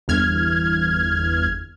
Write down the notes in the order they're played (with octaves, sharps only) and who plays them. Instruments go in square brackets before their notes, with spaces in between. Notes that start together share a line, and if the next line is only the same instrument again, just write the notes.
[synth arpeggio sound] G1 E2 F6 G#6